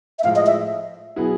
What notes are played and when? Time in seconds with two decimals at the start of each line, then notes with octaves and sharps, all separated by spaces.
0.19 E5
0.24 A2 F3 G#3 F5
0.36 D#5
0.46 E5
1.16 B2 F#3 B3 E4 G#4